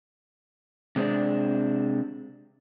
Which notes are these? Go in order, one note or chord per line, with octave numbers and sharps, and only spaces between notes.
C3 G#3 C4 D4